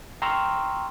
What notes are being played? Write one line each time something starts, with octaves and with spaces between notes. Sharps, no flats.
G5 A#5 C6 C#6 E6 F6